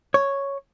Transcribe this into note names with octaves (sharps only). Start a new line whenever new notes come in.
C#5